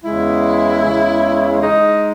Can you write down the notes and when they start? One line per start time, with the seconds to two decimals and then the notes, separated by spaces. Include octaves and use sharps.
0.04 E2 C#3 G#3 E4
0.83 E2 C#3 G#3
1.62 G#3 D#4